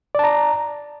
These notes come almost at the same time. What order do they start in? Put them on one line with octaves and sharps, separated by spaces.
D5 A5 A#5